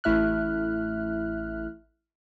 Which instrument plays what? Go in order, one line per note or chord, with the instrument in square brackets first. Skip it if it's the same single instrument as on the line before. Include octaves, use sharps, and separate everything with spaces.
[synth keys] A1 A3 E4 E5 F6 F#6